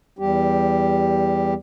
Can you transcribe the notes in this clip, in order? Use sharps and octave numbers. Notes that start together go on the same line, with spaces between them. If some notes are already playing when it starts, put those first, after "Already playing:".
E2 G3 G4